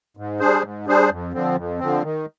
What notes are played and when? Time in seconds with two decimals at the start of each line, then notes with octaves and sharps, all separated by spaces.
0.17 G#2
0.39 G3 D4 G#4 C5
0.63 G#2
0.86 G3 D4 G#4 C5
1.09 F2
1.33 D3 F3 C4
1.57 F2
1.79 D3 F3 C4
2.03 D#3